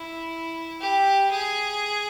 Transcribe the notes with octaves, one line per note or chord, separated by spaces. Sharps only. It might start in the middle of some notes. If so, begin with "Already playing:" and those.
Already playing: E4
G4
G#4